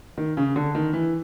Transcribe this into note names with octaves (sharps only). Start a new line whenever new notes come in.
D#3
C#3
D3
D#3
E3